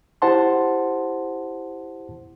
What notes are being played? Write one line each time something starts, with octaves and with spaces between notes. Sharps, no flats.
E4 G4 C5 F#5 A5 C6